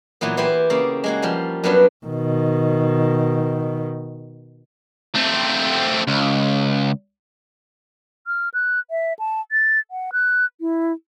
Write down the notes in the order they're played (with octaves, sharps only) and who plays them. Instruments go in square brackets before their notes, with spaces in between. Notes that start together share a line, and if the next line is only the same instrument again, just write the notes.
[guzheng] A#2 E3 F#3 B3
E3 E4 G4 C5
C#3 A#3 D5
G#3 A#3 F#4
F3 G3
F#2 F#3 G3 B3 D4 B4
[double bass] B2 D#3
[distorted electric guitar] A3 C4
C#2
[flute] F6
F#6
E5
A5
A6
F#5
F#6
E4